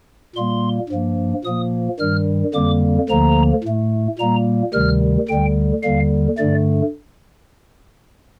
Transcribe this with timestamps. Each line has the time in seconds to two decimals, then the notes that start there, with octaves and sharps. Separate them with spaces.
0.35 A#2 G3 A#3 C6
0.90 G2 F3 A#3
1.44 A#2 F3 A#3 D#6
1.99 G2 D#3 G3 F6
2.54 F2 D3 G3 A#3 D6
3.09 D2 D3 F3 A#3 A#5
3.64 A2 A3
4.19 A#2 G3 A#3 A#5
4.73 D2 C3 D#3 G3 F6
5.29 D2 D3 G3 G5
5.83 D#2 D3 G3 F5
6.38 G2 D3 A3 D5